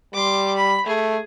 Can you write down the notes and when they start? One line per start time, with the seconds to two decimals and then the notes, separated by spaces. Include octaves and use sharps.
0.14 G3 C6 D6
0.56 B5
0.86 A3 G#4